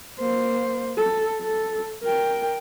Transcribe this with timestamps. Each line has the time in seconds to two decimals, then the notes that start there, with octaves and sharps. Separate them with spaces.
0.20 A#3 C5
0.98 A4
1.42 A4
2.03 A#4 G5